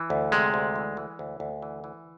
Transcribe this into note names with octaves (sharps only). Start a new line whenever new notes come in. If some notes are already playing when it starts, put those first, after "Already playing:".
Already playing: E3
D2
C3 G#3
D2
E3
E3
D2
D2
E3
E3